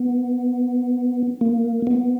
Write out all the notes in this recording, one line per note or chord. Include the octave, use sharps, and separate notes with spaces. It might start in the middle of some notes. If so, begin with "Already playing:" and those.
Already playing: B3
A#3
B3